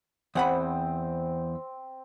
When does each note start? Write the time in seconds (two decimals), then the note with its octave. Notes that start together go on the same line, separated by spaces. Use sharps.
0.35 E2 C4 F#5 B5